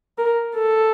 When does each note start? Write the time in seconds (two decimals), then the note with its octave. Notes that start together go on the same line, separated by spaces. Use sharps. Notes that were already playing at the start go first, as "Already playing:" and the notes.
0.18 A#4
0.56 A4